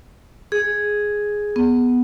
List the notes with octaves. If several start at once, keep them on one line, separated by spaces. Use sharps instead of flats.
G#4
B3